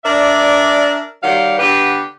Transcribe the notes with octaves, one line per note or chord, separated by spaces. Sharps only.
D4 A#4 D5 E5
D#3 F#3 G3 G4 F5 F#5
D3 B3 G4 B4